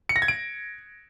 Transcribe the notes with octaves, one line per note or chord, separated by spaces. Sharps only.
C#7
A#6
G#6
D7